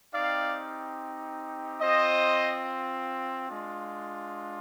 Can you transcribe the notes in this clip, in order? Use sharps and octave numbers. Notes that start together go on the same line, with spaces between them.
C4 D#4 G4 D5 F5
C4 F4 C5 D#5
G#3 D4 F4